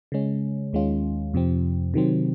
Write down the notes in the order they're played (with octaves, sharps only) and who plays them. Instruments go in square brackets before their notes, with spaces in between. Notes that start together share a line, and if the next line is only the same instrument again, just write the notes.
[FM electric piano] C#3 G#3 C#4
D#2 D#3 G#3 C#4 F4
F2 C3 F3 C4
C3 D#3 F#3 C4